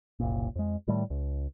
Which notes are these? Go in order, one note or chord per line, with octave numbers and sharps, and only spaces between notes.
F#1 C2 A#2
F2 G#3
A2 D#3 G3 A3
C#2